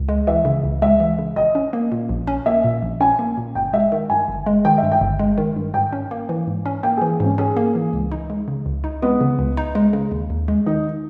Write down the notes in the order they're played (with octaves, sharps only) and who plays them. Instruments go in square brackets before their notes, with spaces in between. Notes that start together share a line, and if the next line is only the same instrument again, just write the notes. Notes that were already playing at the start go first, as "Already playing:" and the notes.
Already playing: [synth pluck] C#2
G#3
[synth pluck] E3 [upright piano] E5
[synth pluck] C#3
C#2
[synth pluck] G#3 [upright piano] E5
[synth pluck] E3
C#3
[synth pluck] A#1 [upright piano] D#5
[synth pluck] C#4
A#3
A#2
A#1
C#4
[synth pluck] A#3 [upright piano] E5
[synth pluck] A#2
A#1
[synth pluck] C#4 [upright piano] G#5
[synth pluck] A#3
A#2
[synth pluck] G1 [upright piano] G5
[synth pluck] G#3 [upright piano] E5
[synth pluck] D#3
[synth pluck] G2 [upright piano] G#5
[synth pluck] G1
G#3
[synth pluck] D#3 [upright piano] G5
[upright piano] E5
[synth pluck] G2
[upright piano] G5
[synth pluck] G1
G#3
D#3
G2
[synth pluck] G#2 [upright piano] G5
[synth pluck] C#4
A#3
E3
G#2
C#4
[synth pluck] A#3 [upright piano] G5
[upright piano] G#4
[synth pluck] E3
[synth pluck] G#2 [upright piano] C#4
[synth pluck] C#4 [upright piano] G#4
[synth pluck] A#3
E3
C#2
D#4
G#3
C#3
C#2
D#4
[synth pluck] G#3 [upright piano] B3
[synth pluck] C#3
C#2
D#4
G#3
C#3
D#2
D#2
G#3
[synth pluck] D#3 [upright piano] D#4